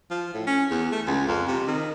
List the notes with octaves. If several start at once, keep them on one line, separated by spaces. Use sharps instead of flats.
F3
A2
C#4
E2
A3
C#2
F2
C3
D#3